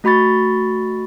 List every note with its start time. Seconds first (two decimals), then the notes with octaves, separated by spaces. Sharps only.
0.04 A3 F#4 B5 C#6 A6